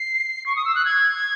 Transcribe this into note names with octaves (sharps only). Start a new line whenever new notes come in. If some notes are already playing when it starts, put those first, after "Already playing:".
Already playing: C7
C#6
D#6
E6
F#6
G#6